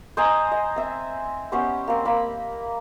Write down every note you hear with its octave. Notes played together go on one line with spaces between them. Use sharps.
C5 D#5 G#5 A#5
D#5
C4 E5
B3 C#4 G4 C5
A#3 C4
A#3 B5 E6